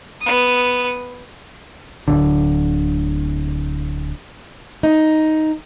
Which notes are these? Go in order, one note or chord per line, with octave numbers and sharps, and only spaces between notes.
B3 D#6
D1 G1 D3
D#4